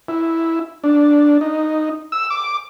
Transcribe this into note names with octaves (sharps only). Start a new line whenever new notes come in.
E4
D4
D#4
E6
D6